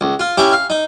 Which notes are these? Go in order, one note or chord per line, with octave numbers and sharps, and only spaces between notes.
C#2
F4
C#4 E4 G4
F5
D#4